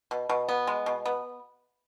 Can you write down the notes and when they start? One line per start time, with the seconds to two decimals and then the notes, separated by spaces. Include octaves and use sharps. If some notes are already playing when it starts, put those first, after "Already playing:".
0.11 B2
0.29 B2
0.49 B3
0.67 G#3
0.86 B2
1.06 B3